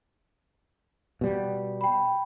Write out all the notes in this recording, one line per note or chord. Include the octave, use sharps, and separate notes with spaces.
B2 G3
G5 B5